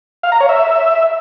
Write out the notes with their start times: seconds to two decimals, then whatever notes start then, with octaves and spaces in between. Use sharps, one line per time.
0.23 F5
0.32 A#5
0.40 C#5
0.49 E5